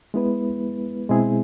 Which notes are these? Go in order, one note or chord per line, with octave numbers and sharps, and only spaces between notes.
G#3 B3 E4 B4
B2 G#3 C4 E4 G#4